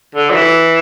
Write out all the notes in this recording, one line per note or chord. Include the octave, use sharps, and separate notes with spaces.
D3
F#3
E3